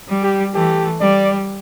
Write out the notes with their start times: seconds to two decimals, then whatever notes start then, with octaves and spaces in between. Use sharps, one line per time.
0.09 G3
0.23 G4
0.54 E3 A3 G4
1.00 G3 D5